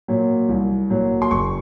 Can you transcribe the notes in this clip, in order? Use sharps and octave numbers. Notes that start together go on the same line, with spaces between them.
A#2 F#3
C2
A#2 F#3
C6
F#1 C#6